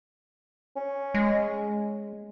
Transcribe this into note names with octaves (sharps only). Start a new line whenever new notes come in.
C#4
G#3